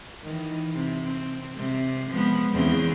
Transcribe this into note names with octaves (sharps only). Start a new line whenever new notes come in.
D#3 E3
C3
C4
C3
F3 G#3 B3
E2 C#3 C4